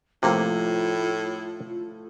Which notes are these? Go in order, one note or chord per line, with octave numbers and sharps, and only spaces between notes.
A2 C3 F3 A3 A#3 F4